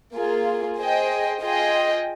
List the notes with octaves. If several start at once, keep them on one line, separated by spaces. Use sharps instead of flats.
A#3 F4 G#4
G#4 C5 D#5 G5
F4 G#4 D#5 G5